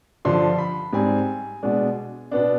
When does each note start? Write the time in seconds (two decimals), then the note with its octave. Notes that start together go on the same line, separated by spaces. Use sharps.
0.25 G2 D3 F3 C6
0.58 B5
0.93 G#2 G3 C4 G#5
1.63 B2 G#3 D4
2.31 B2 B3 D4